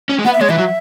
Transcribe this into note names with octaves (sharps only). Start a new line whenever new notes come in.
C#4
G#3
B3 F#5
E5
G#3 C#5
E3 E5
F#3